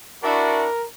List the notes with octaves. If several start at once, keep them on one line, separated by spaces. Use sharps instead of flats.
D4 E4 F#4 A#4